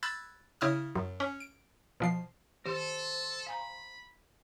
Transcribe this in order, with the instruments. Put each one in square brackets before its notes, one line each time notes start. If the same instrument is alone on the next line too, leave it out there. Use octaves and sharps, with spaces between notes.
[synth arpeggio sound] B5 E6 F#6 G#6 A6
C#3 E4 D#6 F6
F#2
C#4
D7
B2 F3 C7
[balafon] D#3 G4 [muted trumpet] A4 [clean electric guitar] C5
[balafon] F5 G#5 A#5 [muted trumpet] B5